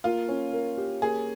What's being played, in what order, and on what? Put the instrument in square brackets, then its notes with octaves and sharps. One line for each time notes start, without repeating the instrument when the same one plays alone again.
[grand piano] A#3 [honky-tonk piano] F4
[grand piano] C#4
A#4
G4
[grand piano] A#3 [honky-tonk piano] G#4